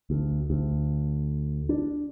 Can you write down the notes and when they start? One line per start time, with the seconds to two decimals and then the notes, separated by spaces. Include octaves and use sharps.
0.10 D2
0.50 D2
1.69 D4